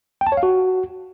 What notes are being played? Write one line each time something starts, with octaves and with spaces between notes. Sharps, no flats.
G5
A5
C#5
F5
F#4